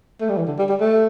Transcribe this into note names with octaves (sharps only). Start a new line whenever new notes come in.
A3
G3
E3
D3
G3
G3
A3